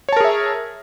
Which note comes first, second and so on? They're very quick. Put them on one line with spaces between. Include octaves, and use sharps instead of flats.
C#5 A5 A#4 G#4 E5